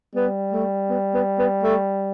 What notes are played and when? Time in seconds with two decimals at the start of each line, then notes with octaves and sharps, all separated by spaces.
0.15 G3 B3
0.53 A3
0.90 B3
1.14 B3
1.39 B3
1.63 A3